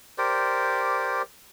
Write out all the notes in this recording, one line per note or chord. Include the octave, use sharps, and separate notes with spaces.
G4 A#4 C5 D5